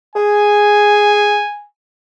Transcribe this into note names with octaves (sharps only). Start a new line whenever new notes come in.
G#4 G#5